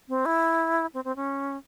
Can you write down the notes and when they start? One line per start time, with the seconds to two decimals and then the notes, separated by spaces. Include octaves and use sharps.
0.09 C4
0.25 E4
0.94 C4
1.04 C4
1.16 C#4